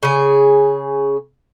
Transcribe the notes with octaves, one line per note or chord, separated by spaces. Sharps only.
C#3 G#4